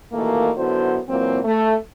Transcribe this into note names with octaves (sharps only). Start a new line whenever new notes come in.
D#2 B2 E3 A3 A#3
F#2 D3 B3 E4 F#4 C5
A#2 E3 F#3 A#3 C4
A3